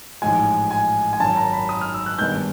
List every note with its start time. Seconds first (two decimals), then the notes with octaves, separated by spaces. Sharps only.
0.22 A1 G#2 F3 G#3 G#5
0.71 G#5
1.13 G#5
1.20 G#1 F#2 D#3 A5
1.37 A#5
1.53 B5
1.69 D#6
1.81 F6
1.94 E6
2.06 F#6
2.18 G#1 G2 D#3 G#3 B3 G6